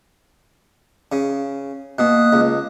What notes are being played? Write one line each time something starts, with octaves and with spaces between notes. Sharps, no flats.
C#3
B2 A#3 D#6 F#6
C#2